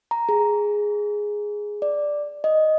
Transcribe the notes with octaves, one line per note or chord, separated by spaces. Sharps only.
A#5
G#4
D5
D#5